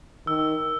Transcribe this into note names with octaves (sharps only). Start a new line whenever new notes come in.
D#3 E6